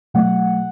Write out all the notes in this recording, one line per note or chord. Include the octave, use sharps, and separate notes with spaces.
B2 F#3 A3 F#5